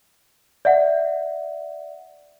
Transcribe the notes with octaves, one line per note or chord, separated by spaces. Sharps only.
D5 E5 F#5